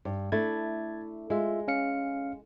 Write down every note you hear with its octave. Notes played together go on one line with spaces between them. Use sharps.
G2
A3 D4 E4 G#6 A6
G#3 F4 E5
C#4 F5 C#7